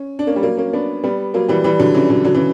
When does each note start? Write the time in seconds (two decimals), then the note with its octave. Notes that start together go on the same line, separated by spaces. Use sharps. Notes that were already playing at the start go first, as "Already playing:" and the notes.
Already playing: C#4
0.19 D4
0.27 A#3 C#4
0.36 G3
0.43 F#3 A#3
0.57 A#3 C#4
0.73 B3 D4
1.04 G3 B3
1.34 F#3 A#3
1.48 E3 G3
1.64 E3 G3
1.79 D3 F#3
1.95 C#3 E3
2.10 D3 F#3
2.24 D3 F#3
2.35 C#3 E3